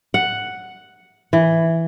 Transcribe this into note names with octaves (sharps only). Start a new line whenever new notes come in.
F#5
E3